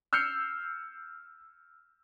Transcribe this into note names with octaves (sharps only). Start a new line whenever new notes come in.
E6 F6 G6 C7 C#7